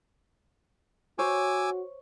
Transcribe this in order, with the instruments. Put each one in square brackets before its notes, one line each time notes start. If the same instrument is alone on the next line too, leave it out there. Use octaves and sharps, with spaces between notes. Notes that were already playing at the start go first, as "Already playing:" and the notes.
[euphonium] F#4 [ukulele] C5 C#5 [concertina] G#5 D6 E6